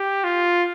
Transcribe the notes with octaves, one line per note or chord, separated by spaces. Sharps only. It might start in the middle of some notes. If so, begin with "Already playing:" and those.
Already playing: G4
F4